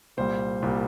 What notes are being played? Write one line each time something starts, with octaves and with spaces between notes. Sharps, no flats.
C2 A#2 G3 C5
C2 A#2 G3